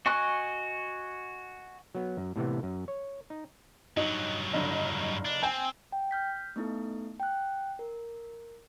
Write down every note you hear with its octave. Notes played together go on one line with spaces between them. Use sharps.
F#4 D#5 G#5 C#6 F#6
F#3 B3
F#2
A2 C3 E3 B3
F#2
C#5
D#4
G2 F#3 D#4
F#1 D3 D#5
D4
C4 G5 G#5
G5
F6 G6 B6
A3 B3 D#4 E4 A4
G5 F#6
A#4